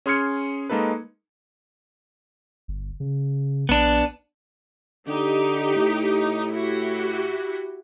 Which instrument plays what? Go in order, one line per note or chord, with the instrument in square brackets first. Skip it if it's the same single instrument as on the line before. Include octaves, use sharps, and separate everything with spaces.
[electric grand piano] C#4 G#4 C6 F6 G#6 C#7
G#3 A#3 D#4 A4 B4
[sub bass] G1
C#3
[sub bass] A#1 [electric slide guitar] B3 D4
[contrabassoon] D3 [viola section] D#4 G4
[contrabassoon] A2
[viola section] E4 F#4 G4